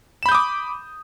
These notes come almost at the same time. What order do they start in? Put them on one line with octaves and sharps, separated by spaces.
E7 B5 G6 D#6 D6